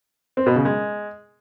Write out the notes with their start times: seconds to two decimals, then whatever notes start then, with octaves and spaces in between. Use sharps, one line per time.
0.37 C4
0.46 B2
0.56 C#3
0.65 G#3